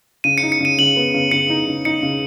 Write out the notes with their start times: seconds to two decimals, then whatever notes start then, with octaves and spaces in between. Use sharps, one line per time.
0.24 C#3 D#7
0.38 C#7
0.43 D#4
0.52 C#7
0.61 C#3 D#7
0.79 C#3 F#7
0.96 B3
1.14 C#3
1.31 C#3 C#7
1.50 D#4
1.68 C#3
1.85 D#4 C#7
2.03 C#3